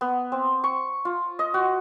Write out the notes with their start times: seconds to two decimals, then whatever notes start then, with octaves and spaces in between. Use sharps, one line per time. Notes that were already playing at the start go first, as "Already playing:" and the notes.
0.01 B3
0.32 C4
0.64 C#6
1.05 F4
1.39 D#5
1.54 F#4